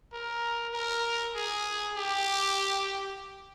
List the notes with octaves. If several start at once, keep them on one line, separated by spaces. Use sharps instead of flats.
A#4
A#4
G#4
G4